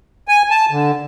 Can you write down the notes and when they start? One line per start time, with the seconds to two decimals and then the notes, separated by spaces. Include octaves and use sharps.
0.28 G#5
0.50 A5
0.71 D3